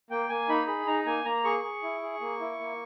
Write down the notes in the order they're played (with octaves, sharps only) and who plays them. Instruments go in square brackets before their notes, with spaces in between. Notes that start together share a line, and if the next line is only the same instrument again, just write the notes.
[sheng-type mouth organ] A#3 G5
A#3 G#5
D#4 B5
G#4 B5
D#4 A#5
A#3 G#5
A#3 A#5
G#4 C#6
G#4
E4
G#4
A#3
E4
A#3